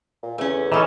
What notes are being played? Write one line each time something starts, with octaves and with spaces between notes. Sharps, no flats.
A#2
E2 A3 C#4
E3 B3 C#4 D#4 A4